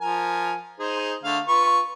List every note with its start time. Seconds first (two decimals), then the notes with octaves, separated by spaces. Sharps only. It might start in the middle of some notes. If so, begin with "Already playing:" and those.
0.01 F3 A#4 G#5
0.79 D#4 G#4 C5
1.24 D3 A3 F5
1.48 F4 B4 C#6